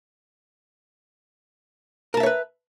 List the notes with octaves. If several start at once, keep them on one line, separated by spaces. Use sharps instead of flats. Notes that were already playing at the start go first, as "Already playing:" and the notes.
A#4 B4 C#5 E5 A5